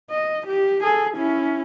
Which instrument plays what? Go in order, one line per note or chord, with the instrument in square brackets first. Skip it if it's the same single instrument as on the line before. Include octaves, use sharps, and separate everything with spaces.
[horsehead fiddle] D#5
G4
G#4 A4
C#4 E4